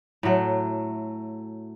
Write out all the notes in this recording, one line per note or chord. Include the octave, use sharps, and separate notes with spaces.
A2 F#3 A3